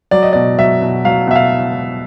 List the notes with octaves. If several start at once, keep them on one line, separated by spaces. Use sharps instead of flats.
F#3 D5
D#5
B2 D5
F#3 E5
B2
F#3 F5
B2 E5
F5